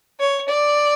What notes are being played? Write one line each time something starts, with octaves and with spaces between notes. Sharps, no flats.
C#5
D5